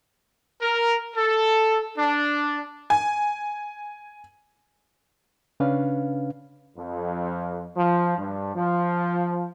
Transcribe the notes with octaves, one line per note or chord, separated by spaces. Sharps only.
A#4
A4
D4
G#5
C#3 C#4 D4 B4 F5
F2
F3
G2
F3